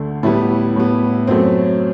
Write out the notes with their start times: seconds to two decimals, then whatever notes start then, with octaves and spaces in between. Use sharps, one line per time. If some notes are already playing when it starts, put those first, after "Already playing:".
Already playing: D2 D3 A3
0.23 A2 G3 B3 E4
0.76 A2 G3 B3
1.27 F#2 F#3 A3 C4